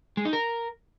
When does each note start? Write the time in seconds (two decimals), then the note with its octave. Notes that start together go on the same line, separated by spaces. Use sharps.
0.17 G#3
0.25 D#4
0.33 A#4